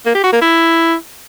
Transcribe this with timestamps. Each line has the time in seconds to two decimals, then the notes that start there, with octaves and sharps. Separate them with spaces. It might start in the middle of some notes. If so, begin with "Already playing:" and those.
0.06 A#3
0.15 G4
0.24 F#4
0.33 A#3
0.41 E4